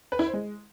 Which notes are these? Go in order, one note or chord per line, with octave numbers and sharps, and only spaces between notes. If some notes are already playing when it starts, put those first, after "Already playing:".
B4
E4
C5
G#3